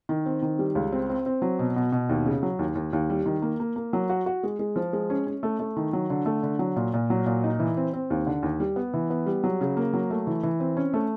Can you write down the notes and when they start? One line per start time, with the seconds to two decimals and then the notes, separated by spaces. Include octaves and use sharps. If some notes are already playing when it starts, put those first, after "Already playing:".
0.09 D#3
0.26 C4
0.42 D#3
0.59 G3
0.75 C#2
0.92 C4
1.09 C4
1.26 C4
1.42 F#3
1.59 B2
1.76 B2
1.92 B2
2.09 D#2
2.26 C#3
2.43 F#3
2.59 D#2
2.75 D#2
2.93 D#2
3.10 G3
3.26 D#3
3.42 A#3
3.60 A#3
3.76 A#3
3.93 F#3
4.09 F#4
4.26 F#4
4.43 G#3
4.59 G#3
4.76 F3
4.93 G#3
5.10 C#4
5.27 C#4
5.43 A3
5.60 A3
5.76 D#3
5.93 F#3
6.10 D3
6.26 A3
6.43 D3
6.59 F#3
6.76 A#2
6.94 A#2
7.10 F#3
7.26 A#2
7.44 D#4
7.60 E3
7.77 C4
7.93 C4
8.10 D#2
8.27 D3
8.43 D#2
8.60 G3
8.76 B3
8.94 E3
9.10 B3
9.26 G3
9.44 F#3
9.61 C#3
9.77 A#3
9.93 F#3
10.10 A3
10.27 E3
10.43 E3
10.60 C4
10.77 C#4
10.94 A3